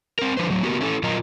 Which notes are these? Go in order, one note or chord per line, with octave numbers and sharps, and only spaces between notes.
C4 A#4
D3 F3 B4 C5
A2 F#3
A#3 B3 F#4 G4 A#4
A3 C#4 E4 A4
A#2 F#3 F4 A#4 D#5 A#5